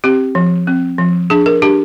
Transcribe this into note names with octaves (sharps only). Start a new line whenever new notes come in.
C4 G4
F3
C4
F3
D4 G#4
A#4
D4 G4